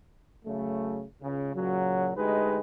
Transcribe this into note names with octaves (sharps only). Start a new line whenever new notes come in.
C#3 F#3 A3
C#2 C#3
A#2 C#3 F#3
D2 G#3 D#4 G4 B4